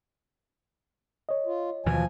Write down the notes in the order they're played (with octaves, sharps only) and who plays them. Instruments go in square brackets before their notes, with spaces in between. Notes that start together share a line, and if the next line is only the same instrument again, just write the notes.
[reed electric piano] C#5 D#5
[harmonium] F4
[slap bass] D#2 B2 E3 [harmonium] F3 G#5